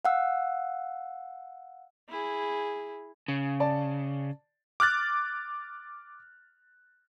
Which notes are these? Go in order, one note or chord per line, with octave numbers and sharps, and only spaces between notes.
F5 F#5 E6
E4 G#4
C#3
D5 A5
D6 F6 F#6 A6